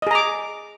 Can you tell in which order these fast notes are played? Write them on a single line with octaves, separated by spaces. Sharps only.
D#5 G#4 A#5 D6